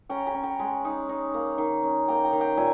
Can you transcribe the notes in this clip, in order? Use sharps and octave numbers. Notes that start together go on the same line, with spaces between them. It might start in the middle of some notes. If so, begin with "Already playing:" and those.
C#4 G5 A#5
G#5 B5
C#4
G5 A#5
G#3 G#5 B5
D#4
D#4
A#3
D#3
C#4
A#3 G5 A#5
G5 A#5
D#3
G5 A#5
A#2 E5 G#5